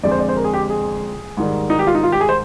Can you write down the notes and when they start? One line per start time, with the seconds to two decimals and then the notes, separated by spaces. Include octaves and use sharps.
0.03 F2 D3 G#3 C4 D5
0.11 C5
0.19 D5
0.29 C5
0.36 A#4
0.44 G#4
0.54 G4
0.70 G#4
1.37 G#2 D#3 G3
1.70 D#4
1.79 G4
1.87 F4
1.95 D#4
2.03 F4
2.12 G4
2.21 G#4
2.29 C5